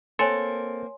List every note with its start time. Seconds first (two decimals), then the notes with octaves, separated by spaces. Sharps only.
0.19 A#3 C4 A4 C#5 G#5 C6